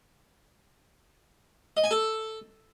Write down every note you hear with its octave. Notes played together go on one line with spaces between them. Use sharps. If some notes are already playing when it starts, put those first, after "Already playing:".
D#5
G#5
A4